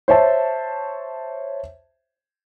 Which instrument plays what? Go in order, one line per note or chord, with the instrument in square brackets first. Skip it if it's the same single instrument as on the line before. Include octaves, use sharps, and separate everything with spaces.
[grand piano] C5 C#5 E5 A5